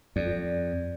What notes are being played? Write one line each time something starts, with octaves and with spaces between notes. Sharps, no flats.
F2 D5